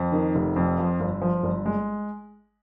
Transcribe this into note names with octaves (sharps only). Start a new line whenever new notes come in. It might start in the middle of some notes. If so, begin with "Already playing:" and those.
Already playing: F2
D#3
F1
F2
F3
G1
F3
G1
G#3